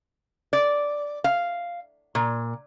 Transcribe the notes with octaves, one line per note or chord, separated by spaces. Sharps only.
D5
F5
A#2